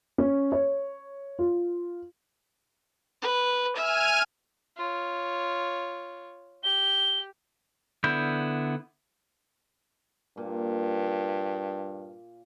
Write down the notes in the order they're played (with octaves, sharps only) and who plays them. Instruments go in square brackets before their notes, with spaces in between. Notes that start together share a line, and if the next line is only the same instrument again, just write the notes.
[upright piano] C#4
C#5
F4
[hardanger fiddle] B4
[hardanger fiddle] E5 [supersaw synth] G#5 F6 D#7
[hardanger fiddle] F4 C#5
[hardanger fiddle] G4 [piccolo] G7
[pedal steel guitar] D3 B3 E4 G6
[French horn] G2 [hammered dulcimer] A#2